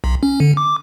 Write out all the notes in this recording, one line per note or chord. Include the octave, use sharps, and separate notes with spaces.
B1
C#4
D3
D6